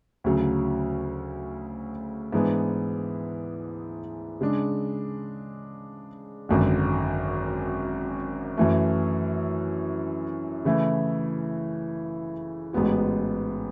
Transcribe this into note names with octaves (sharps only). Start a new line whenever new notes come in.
D2 C#3 F#3
G#2 E3 B3 D4 G#4
C#3 G#3 D4
G#1 F#2 D3
F#2 E3 A3
C#3 E3 A3 E4
A1 G#2 G#3 B3 F#4